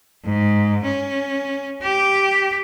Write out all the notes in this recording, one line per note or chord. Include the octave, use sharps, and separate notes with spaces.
G#2
C#4
G4